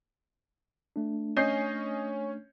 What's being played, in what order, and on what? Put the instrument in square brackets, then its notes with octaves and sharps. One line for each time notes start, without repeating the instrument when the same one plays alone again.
[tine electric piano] A3 D4
[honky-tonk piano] C#4 [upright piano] D#5 G6 C7